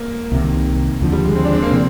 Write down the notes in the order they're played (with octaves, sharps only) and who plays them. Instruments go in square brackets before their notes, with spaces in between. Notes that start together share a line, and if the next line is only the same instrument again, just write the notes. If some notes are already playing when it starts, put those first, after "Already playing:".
Already playing: [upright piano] A#3
[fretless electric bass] C2 C3 D#3
D#2 D3 F3
[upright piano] G3
G#3
C4
D4
C4
A#3
[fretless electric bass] C3 F3 [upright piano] C4